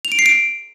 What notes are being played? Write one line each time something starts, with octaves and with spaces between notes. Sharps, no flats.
F7
D7
C7
D7